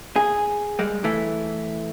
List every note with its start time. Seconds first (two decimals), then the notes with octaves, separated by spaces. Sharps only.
0.16 G#4
0.79 G3 G#3
1.04 E3 A3